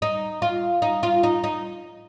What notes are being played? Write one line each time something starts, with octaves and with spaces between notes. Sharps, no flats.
D#4
F4
D#4
F4
D#4
D#4